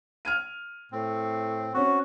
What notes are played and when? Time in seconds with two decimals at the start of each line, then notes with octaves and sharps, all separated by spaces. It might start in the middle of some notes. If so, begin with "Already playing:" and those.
0.25 F6 G#6 D#7
0.92 A2 C4
1.74 C4 C#4 F#4